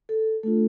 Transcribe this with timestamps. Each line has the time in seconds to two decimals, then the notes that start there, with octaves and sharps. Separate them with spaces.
0.09 A4
0.43 A3 D4 F4 A4